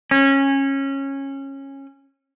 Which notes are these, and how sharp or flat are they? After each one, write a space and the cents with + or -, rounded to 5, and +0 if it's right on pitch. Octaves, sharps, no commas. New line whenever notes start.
C#4 -20